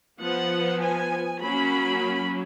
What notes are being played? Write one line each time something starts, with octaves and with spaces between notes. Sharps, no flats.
F3 B3 F#5
G#5
F#3 A#3 C#4 B5